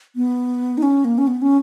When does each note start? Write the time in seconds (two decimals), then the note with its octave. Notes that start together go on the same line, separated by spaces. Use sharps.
0.16 B3
0.78 D#4
0.83 C#4
1.05 A#3
1.18 C#4
1.27 B3
1.42 C#4